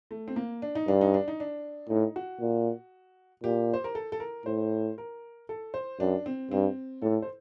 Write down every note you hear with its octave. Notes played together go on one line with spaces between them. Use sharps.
A3
C4
A#3
D4
D#4
G2 D4
D#4
D4
D#4
D4
A2 D#4
F#4
A#2
A#2 G4
C5
A#4
A4
A4
A#4
A2 C5
A#4
A4
C5
F#2 D4
C4
G2 C4
A2 A4
C5